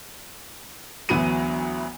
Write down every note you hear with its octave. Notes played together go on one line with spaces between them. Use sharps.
D2 E3 F#3 B3 D#7